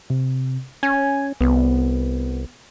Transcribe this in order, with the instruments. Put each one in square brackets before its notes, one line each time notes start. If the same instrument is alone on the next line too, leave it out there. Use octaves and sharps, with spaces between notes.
[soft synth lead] C3
[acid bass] C#4 [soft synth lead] G#5
[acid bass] C2 [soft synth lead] B3